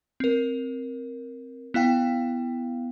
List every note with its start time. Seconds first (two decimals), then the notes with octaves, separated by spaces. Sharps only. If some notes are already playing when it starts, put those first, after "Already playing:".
0.20 C4 A#4
1.74 B3 E4 F5 G5